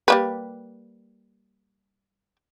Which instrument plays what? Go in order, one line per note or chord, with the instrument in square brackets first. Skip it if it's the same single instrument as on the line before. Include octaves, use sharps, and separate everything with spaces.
[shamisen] G3 A#3 B4